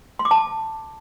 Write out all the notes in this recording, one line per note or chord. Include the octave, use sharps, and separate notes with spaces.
C6
D6
A5